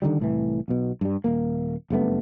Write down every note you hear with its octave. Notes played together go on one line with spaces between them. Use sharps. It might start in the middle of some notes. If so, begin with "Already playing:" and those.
D3 D#3 F3 G3
C2 A2 E3
B1 B2
G2 G3
D#1 A#3
F#1 G2 A3 B3